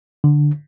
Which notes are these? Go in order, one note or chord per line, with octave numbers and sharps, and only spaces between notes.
D3